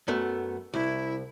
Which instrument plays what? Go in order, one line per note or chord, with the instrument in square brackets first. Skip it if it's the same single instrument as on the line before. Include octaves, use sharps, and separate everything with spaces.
[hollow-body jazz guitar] F#2 A3 B3
[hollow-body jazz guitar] C2 [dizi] E4